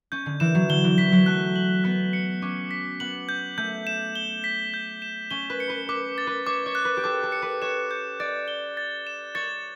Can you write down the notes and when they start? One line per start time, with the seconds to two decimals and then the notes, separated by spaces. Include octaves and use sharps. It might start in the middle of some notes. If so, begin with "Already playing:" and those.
0.12 C#4 G6
0.26 D3
0.40 E3 E7
0.55 F#3
0.69 D3 G7
0.84 E3
0.98 F#3 B6
1.12 F#3
1.26 A3 F#6
1.56 F#7
1.84 B3 F#6
2.13 C#7
2.42 C#4 D6
2.71 B6
3.00 B3 F#7
3.29 G6
3.58 A3 G6
3.87 E7
4.16 G7
4.44 B6
4.74 G6
5.02 E7
5.31 C#4 G7
5.50 B4
5.60 C#7
5.70 B4
5.89 B4 D6
6.18 A6
6.27 B4
6.46 C#5 D6
6.66 C#5
6.75 F#6
6.85 B4
6.97 G4
7.04 A4 D6
7.23 A4
7.32 C#7
7.42 B4
7.62 C#5 E7
7.91 G6
8.20 D5 A6
8.48 G7
8.77 A6
9.07 E7
9.35 C#5 A6